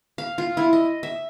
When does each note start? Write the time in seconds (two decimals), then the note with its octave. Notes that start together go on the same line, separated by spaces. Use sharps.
0.18 F5
0.38 F4
0.57 E4
0.73 D#5
1.03 E5